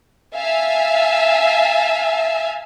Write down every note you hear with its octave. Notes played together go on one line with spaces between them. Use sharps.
E5 F5 G#5 A5